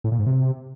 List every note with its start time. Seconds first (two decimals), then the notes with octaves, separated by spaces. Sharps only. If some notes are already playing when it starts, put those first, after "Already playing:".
0.04 A2
0.12 A#2
0.19 G#2
0.26 C3